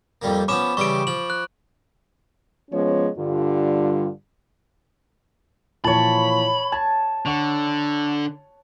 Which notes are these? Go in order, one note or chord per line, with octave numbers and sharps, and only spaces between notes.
F2 G3 A#3
F3 B3 C#4 B5 D6 E7
C#3 E3 G3 C#6 D7
F3 F#7
F#6
F3 G#3 B3 C#4 C#5
G2 D3 G3 F4
A#2 E3 F3 C#5 A5 B5
A5 G#6
D3 F#5 C#6 F7